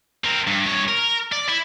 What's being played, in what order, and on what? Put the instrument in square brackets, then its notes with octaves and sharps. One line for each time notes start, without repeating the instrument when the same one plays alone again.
[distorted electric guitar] C4 A#4
G2
G2 C#5
A#4
D5
E4